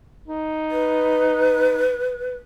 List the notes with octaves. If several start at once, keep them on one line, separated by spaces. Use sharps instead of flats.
D#4
B4